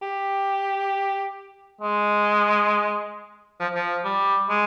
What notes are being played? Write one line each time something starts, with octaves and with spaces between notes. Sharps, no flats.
G4
G#3
F3
F3
G3
G#3